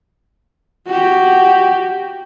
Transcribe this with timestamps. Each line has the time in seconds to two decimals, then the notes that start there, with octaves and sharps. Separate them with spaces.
0.87 F#4 G4